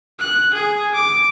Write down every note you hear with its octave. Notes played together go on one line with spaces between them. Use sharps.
F#6
G#4
D6